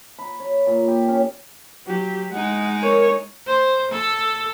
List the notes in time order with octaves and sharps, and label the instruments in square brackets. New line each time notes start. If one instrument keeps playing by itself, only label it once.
[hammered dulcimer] B5
C#5
A#2
G4
C#4
[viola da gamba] F#3 [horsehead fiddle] G4
[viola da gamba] G#3 D#4 [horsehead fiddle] F#5
[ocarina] A#4 [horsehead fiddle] C#5
[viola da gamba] C5
A4